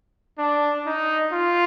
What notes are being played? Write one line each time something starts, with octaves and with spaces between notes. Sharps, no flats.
D4
D#4
F4